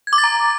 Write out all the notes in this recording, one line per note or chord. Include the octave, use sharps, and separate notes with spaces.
G#6
D6
A6
A#5